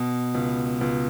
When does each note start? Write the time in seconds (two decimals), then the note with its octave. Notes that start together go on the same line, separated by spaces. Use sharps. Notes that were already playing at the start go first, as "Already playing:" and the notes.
Already playing: B2
0.35 C#2
0.81 C#2